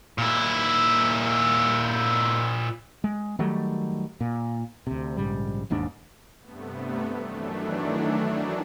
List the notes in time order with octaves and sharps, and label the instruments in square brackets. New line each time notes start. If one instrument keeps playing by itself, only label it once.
[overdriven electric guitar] A#2 E4
[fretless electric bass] G#3
D#3 F#3 G3 A3
A#2
D2 C3
A#1 G#2 C#3 G3
E1 D#2 G#2 D4
[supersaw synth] G2 C3 A3 B3
D#3 E3 F#3 A3 D4